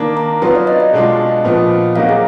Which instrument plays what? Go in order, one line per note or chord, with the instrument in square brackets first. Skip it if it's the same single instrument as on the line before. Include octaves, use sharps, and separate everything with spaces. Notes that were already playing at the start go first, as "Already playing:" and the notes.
Already playing: [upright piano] D#3 A#3 D4
[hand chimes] A#5
[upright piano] F#3 B3 F4 [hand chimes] B4
[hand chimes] D5
D#5
D#5
[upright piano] B2 G#3 D4 F4
A#2 F3 B3 F4
[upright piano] F#3 A#3 D#4 F#4 [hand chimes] F5
[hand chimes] G#4